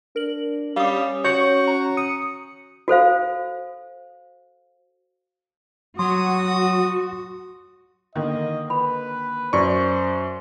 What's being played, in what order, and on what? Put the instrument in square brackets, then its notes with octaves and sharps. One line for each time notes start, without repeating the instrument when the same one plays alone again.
[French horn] D4 [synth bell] A#4 F#7
[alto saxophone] G3 [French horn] C#4 [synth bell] F5 D#6
[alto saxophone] F#4 [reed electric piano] C#5 C#6 [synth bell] G6
[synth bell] A#5
[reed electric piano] D#6 [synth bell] C#7
[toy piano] F#4 A4 C5 F5
[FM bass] F#3 [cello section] F#4 [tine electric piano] C6 [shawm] D#6
[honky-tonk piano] D3 D#3 A#3 [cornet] D#5
[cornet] B4 [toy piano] B5
[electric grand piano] F#2 C#6 [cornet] C5 [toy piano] D5